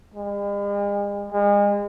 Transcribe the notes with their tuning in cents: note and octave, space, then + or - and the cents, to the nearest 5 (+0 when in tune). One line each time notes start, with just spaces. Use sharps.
G#3 -45
G#3 -35